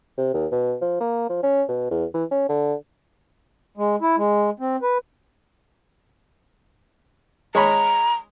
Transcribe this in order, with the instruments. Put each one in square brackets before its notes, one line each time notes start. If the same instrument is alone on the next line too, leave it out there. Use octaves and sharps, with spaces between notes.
[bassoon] C3
D#2
B2
F3
A#3
F3
C#4
B2
E2
E3
C#4
D3
[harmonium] G#3
E4
G#3
C4
B4
[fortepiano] G#3 C#5 B5 [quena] A#5